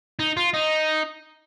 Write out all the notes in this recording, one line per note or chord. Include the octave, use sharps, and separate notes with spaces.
D#4
F4
D#4